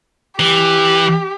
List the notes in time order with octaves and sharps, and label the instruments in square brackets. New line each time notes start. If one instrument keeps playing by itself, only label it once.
[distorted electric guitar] E3 [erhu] G4